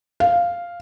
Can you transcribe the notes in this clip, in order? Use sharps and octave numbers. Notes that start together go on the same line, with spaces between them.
F5